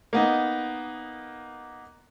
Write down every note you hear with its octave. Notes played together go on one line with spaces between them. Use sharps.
A#3 B3 D#4